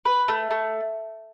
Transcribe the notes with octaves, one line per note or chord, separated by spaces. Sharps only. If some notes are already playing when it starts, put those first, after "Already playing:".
B4
A3
A3